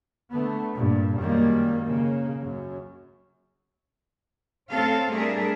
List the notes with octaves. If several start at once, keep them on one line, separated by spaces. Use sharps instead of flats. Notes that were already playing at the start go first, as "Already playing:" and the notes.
D3 A3 B3
G2 A#2
F#2 D#3 G3 G#3 A#3
C#3 A#3
F#2
A3 C4 C#4 A4 F5
G3 A3 D4 G#4 A#4 E5